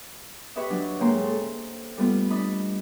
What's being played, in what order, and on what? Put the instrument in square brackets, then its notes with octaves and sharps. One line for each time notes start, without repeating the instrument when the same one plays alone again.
[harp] G4 B4 C#5 D#5 E5
F#3 D4 F#4
G#2 C#3 A#3 G5 A#5 C6
A4 C5
G3 A3 B3 F4
D4 D#5 B5